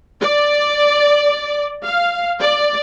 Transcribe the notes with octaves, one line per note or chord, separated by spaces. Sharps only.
D5
F5
D5